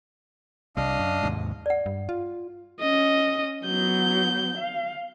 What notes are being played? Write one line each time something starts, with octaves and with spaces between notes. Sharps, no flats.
C2 G3 D4 D#5 F5
F#2
D#2 G#2 C3
D5 F#5
G2
F4
C#4 D#5
F#3 B3 G6
F5